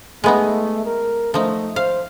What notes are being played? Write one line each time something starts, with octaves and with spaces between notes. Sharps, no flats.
G#3 A3 B3 D#4
A#4
F3 A3 D#4
C5 F5